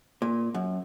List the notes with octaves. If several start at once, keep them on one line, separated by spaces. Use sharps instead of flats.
A#2
F#2